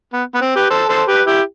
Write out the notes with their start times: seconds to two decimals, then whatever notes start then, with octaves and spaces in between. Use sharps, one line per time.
0.13 B3
0.35 B3
0.41 C4
0.56 G4 B4
0.70 A4 C5
0.89 A4 C5
1.08 G4 B4
1.27 E4 G4